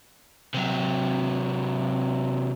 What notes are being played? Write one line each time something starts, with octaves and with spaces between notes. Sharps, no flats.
C3 F#3